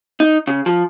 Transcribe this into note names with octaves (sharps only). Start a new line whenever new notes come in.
D#4
C#3
F3